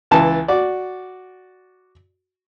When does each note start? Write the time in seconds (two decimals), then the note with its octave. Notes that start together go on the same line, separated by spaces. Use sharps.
0.11 C#2 E3 A5
0.48 F#4 D5